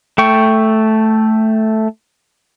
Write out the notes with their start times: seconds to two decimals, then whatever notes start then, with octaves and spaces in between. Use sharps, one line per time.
0.18 A3 G5 C#6